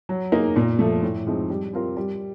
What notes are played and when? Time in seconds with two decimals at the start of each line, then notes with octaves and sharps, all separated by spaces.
0.09 F#3
0.32 A#3 D#4 G#4
0.56 A#2
0.79 F3 A3
1.03 A2
1.27 F3 G#3 C4 D#4
1.50 G3
1.73 C4 F4 A#4
1.97 G3